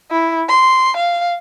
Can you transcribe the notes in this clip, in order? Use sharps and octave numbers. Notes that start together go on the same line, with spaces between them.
E4
C6
F5